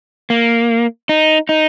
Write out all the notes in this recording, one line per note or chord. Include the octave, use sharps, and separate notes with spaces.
A#3
D#4
D#4